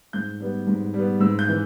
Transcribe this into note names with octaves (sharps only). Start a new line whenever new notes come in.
G#2 G6
G3 B3
G#2
G3
B3
G#2 E6
G6
E3